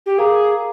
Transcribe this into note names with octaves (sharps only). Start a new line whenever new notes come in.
G4
G#4 A#4 F5 A#5 D6